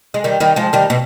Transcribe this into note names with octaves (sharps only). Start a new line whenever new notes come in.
G#3
D#3 G3
D#3 G3
F3 G#3
D#3 G3
B2